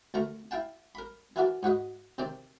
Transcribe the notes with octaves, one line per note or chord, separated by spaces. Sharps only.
D2 A3 A#4 A#5
E4 F5 G5 A5
A#4 B5
E3 E4 F#4 A#4 D5
G#2 F#4 B4 D#5
C3 D#3 C4 D5